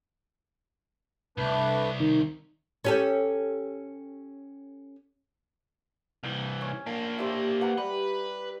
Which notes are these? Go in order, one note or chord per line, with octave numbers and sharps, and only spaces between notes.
C2 A3 D4 B4
D#3
C#4 G4 A4
C2 E3
C#4
A#3 D4
E4 G4 C5
B4 F#5 A#5
G3 B4